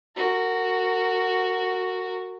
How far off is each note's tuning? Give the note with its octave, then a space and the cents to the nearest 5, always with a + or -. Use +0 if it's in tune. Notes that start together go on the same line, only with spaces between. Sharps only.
F#4 +0 A#4 -30